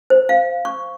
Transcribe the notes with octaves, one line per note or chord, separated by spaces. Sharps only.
C5
F5
C#6